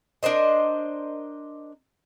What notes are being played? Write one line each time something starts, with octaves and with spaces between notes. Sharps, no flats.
D4 A#4 C5 D#5